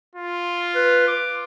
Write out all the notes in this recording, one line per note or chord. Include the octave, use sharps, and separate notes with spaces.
F4
B4
D6